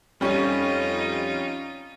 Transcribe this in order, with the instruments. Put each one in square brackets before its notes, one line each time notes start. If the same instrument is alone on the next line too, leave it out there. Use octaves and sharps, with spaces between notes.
[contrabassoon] F2 [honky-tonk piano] G3 C#4 [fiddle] D#4 F4